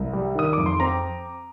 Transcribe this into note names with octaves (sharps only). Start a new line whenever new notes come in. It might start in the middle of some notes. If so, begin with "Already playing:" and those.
Already playing: C2
G3
D#3 D#6
F2 D6
C6
C4 A#5